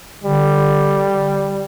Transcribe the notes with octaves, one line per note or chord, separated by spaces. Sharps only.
D3 G3